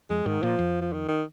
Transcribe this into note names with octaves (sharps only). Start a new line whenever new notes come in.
F2 G#3
G#2 D#3
A#2 F3
F2
F3
D#3
D#3